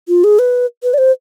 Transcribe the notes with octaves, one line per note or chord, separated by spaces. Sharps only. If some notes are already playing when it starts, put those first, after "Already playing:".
F4
G#4
B4
B4
D5
C5